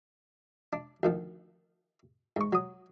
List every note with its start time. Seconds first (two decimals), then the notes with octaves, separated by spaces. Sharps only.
0.73 D4
1.03 D2 D#3 F3
2.36 G#2 C#6
2.53 F#3 D#6